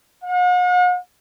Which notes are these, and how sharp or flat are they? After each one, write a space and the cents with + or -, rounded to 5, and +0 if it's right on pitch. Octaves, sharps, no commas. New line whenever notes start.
F#5 -45